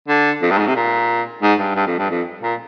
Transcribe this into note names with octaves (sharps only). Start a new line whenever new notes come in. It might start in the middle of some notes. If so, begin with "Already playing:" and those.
D3
F2
G2
G#2
C3
A#2
G#2
G2
G2
F2
G2
F2
A#2